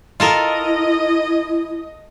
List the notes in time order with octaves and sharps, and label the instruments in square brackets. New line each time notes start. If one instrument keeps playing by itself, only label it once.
[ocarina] E4 [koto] F4 A4 A#4 [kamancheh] D#5